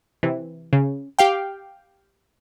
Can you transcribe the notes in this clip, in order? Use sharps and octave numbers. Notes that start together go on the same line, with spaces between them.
C3 E3
C#3
G4 F5 G5